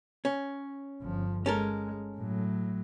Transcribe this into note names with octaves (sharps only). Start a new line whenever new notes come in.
C#4
G1 F3
G#3 C#4 A4 A#4
A2 F#3